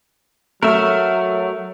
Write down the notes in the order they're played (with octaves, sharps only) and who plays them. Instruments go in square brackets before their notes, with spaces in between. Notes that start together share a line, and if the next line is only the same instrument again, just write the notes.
[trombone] F#3 [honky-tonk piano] A3 [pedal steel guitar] A#4 E5